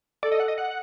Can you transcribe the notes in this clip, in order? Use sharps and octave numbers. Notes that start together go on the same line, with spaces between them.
A4 D5
D#5
F#5
D#5
F#5